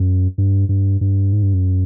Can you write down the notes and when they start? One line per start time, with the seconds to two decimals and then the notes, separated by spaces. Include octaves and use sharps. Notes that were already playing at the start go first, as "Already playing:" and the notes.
Already playing: F#2
0.38 G2
0.69 G2
1.01 G2
1.32 G#2
1.43 G2
1.54 F#2